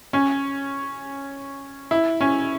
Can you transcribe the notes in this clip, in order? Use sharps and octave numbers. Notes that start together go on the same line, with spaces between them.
C#4
E4
C#4